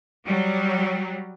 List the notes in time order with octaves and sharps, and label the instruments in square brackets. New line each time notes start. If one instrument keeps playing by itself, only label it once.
[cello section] F#3 G3